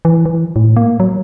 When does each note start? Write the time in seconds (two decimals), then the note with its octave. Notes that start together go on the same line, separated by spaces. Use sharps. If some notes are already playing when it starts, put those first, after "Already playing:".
0.05 E3
0.25 E3
0.56 A2
0.76 A#3
1.00 F#3